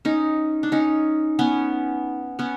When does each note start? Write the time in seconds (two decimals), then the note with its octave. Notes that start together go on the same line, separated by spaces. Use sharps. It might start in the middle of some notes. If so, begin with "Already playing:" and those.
0.05 C#4 D#4
0.63 D4
0.72 C#4 D#4
1.39 B3 C#4
2.39 B3 C#4